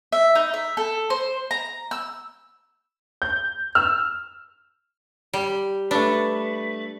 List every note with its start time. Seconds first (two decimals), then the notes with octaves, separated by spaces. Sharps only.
0.12 E5
0.35 D#4
0.54 E5
0.77 A4
1.10 C5
1.51 A#5
1.91 E6
3.22 G6
3.75 E6 F6
5.33 G3
5.91 A3 D4 B4